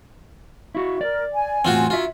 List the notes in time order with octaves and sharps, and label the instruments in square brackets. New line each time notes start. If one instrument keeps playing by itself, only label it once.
[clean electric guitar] E4 F#4 [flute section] C#6
[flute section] A#4 [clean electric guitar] D5
[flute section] G#5
[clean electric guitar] E2 A2 [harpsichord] C4 F4 F#4
[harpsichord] F4 [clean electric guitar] F#4 E5